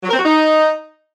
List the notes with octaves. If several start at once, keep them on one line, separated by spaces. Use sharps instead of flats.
F#3
A#4
C4
F#4
D#4